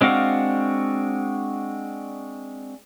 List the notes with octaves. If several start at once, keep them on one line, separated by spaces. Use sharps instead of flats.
G#3 C4 D4 F#4 F5